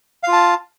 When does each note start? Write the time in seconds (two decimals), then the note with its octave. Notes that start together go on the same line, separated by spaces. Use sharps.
0.23 F5
0.28 F4
0.33 A5